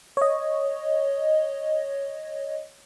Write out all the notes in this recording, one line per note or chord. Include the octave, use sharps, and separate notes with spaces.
C#5 D#5